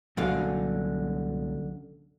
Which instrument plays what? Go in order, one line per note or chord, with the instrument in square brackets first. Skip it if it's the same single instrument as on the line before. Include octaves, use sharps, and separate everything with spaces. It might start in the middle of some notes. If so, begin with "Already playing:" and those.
[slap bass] C2 A#2 F#3 [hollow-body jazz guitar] F#2 D3 F5